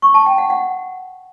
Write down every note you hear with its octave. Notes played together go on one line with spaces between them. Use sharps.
C#6
A5
G5
F#5
F#5